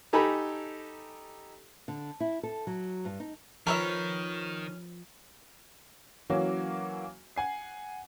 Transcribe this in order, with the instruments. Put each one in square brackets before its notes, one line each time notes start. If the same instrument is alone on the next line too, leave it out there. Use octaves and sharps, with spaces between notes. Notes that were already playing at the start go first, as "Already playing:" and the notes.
[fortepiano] D#4 G4 A4 G#5 A#5 B5
[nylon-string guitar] D3
E4
A4
F#3
G2
D#4
[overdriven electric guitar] D#3 [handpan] F3 [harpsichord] C#4 [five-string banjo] A#4 B4 E5
[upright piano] E3 F#3 A#3 C#4 F#4
F#5 G#5 C7